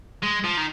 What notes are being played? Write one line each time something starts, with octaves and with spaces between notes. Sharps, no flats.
G#3
F3
D#3